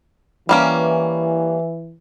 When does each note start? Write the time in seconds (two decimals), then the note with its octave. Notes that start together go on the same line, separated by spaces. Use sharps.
0.49 E3 G3 A#3 C#4